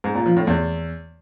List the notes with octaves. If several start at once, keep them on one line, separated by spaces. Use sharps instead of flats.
G#2
A#2
F3
A2
E2